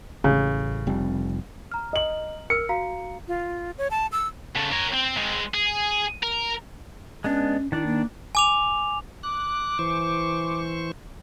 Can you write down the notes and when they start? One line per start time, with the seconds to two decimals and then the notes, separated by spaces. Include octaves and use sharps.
0.24 A1 C#3
0.87 F1 G3 C4
1.72 A#5 F6
1.93 D#5 F#7
2.50 A#4 E6 F6 C#7
2.69 F#4 F5 A#5
3.28 F4
3.78 C#5
3.91 A5
4.12 E6
4.56 C#3 A3
4.73 A#4 C#5
4.94 C4
5.17 G#3 C4
5.54 G#4
6.23 A#4
7.24 G#3 B3 C#4 D4
7.72 D#3 D4 E4 D5
7.86 A#3
8.35 G#5 D6 F7
9.23 D6 F#6
9.79 E3 C5 C#6